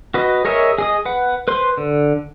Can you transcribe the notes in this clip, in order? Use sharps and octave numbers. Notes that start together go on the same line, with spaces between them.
F#4 B4 D#5
G#4 A#4 C#5 D#5 E5
G#4 D#5 D#6
B4 F#5
B4 C5 C6
D3